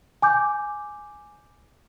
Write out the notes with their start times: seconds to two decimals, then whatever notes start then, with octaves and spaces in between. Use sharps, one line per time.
0.22 G#5 D6 G6